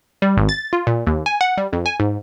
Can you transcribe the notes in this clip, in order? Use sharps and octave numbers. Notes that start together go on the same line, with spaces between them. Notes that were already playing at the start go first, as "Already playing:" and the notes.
G3
G#1
A6
F4
A#2
D#2
G#5
F#5
G3
F2
G#5
G#2